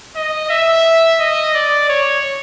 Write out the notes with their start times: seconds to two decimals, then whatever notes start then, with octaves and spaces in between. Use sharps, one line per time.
0.16 D#5
0.50 E5
1.20 D#5
1.54 D5
1.89 C#5